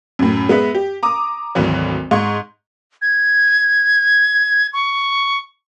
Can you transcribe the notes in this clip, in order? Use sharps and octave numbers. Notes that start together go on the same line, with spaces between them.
F#2 A2
G#3 B3 B4 E5
G4
A#5 D6 D#6
G#1 D2 E3 F#3
G#2 C6 C#6 G#6
G#6
C#6